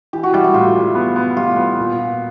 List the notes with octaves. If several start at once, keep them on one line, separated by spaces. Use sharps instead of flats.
E3 G4
F#4
G3 E4
E4
A2 F4
G3
B3
B3
G3 F4
B3
A#2
A#2